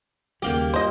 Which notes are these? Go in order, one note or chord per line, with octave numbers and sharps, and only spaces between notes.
D#2 C#3 G3 A#3 F4 G4
G2 C5 D#5